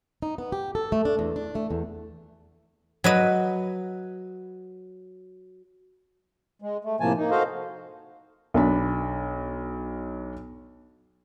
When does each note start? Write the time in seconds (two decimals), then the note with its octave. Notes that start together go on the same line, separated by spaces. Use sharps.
0.22 D#4
0.38 B3
0.52 G4
0.75 A4
0.92 A3
1.05 D4
1.19 E2
1.36 D4
1.55 A3
1.71 E2
3.04 F#3 B4 D#5
6.62 G#3
6.84 A3
7.00 A2 C3 F3 A#3 G#5 A5
7.17 A#3 D#4
7.31 F#4 A4 C5 D#5 F5
8.54 B1 D4 B5